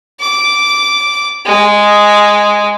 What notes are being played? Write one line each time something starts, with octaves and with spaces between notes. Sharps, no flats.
D6
G#3